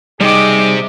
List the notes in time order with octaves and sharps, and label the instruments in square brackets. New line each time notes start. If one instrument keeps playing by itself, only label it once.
[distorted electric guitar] C3 [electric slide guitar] G3 G5 [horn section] D#4 G#4 [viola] D#5 D6